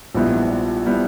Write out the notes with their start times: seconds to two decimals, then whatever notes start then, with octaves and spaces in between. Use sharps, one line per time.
0.15 A#1 G#2 G3 B3 E4
0.86 G3 B3 E4